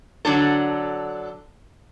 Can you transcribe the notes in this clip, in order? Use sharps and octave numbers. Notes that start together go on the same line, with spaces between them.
D3 F#3 D4 A4